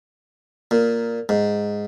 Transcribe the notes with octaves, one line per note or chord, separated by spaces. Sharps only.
A#2
G#2